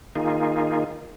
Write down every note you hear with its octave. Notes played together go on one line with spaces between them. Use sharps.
D#3 A#3 D#4 F4 G#4